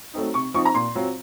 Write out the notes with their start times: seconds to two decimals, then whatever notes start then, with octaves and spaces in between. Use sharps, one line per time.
0.14 F#3 A3 C4 D#4
0.34 C3 C#6
0.54 F3 C4 D#4 C#6
0.65 A#5
0.74 A#2 C6
0.95 F#3 C4 F4